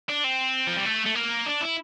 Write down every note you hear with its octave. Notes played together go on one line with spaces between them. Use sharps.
D4
C4
F3
G3
A3
A3
A#3
D4
E4